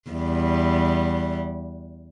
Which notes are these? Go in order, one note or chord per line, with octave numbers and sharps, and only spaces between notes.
E2 G3